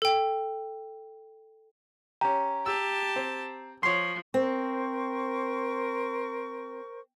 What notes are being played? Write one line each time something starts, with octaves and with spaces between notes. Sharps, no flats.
A4 G5
C#4 G4 A#5
G4 A5 E6
C4
F3 C#5 C6 C7
C4 A#4 C5 C#6